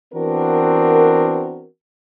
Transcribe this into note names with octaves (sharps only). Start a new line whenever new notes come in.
E3 B3 C4 D4 F#4 A#4